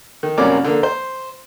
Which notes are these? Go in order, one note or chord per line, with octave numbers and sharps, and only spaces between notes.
D#3
C2 F#2 A#3 C#4 D5 D6
D3 A#3
C5